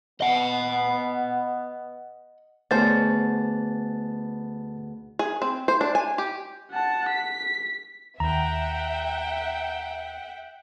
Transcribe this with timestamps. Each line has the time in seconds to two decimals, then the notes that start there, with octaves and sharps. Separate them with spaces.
0.21 B3 D#5 F#5
2.71 D2 A3 B3 C#4 G#4 C5 A5 A6
5.19 G#4
5.42 C4
5.68 C5
5.81 D4
5.95 G#5
6.18 G4
6.72 F#5 A5
7.09 B6
8.20 D#2 E5 F#5 G5 A#5